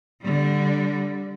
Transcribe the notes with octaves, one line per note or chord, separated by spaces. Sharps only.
D3 G3